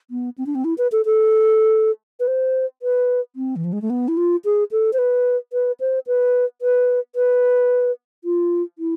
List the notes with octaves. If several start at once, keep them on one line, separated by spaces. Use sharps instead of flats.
B3
C4
D4
C4
E4
B4
A4
A4
B4
C5
B4
C4
E3
F3
G#3
A3
B3
E4
F4
G#4
A4
C5
B4
B4
C5
B4
B4
B4
F4
E4